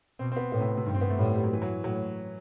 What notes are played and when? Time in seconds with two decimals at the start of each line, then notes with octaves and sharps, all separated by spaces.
0.19 B2 C4
0.32 C4
0.37 B3
0.52 A2 B3
0.60 C3
0.77 C3
0.85 G2 D#3
0.94 C4
1.01 B3
1.10 A3
1.18 A2 G3
1.34 G3
1.44 F#3
1.53 E3
1.62 F#3
1.84 A2 F#3